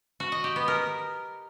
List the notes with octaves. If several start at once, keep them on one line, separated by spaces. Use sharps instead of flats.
F#4
D#5
G4
B3
A#4